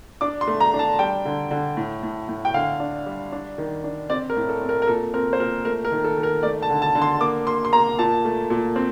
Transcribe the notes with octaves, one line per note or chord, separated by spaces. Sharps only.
D4 D6
C6
A3
A#5
D4
A5
G3 G5
D3
D3
A2
A2
A2
G5
D3 F5
D4
G3
D4
D#3
D4
C4 D5
A#4
A2
A4
C4
A#4
A#4
A#2 A4
C4 A#4
C5
A#2 A#4
A3 A#4
A#4
D#3
A4
D#3
A#4
A3 D5
A5
D3
A5
D3
C6
A#3 D6
A#3 C6
C6
A#3 A#5
A#2 A5
A3
A#2
C4